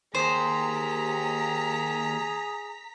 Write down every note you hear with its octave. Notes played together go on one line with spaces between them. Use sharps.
D#2 G#4 C5 A#5 B6